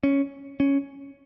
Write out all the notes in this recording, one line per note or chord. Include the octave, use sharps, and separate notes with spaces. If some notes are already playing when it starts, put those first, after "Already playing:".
C#4
C#4